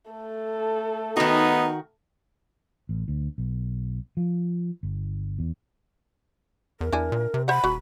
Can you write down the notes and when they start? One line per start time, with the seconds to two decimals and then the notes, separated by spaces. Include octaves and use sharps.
0.11 A3 A4
1.17 D#3 B3 D#4 F#4
2.89 A1
3.08 D2
3.38 B1
4.17 F3
4.83 G1
5.39 E2
6.81 E2 A#4
6.92 E2 D4 E4 G#5
7.12 A#2
7.34 C3
7.48 C5 E5 F#5 B5
7.64 D#1 F#3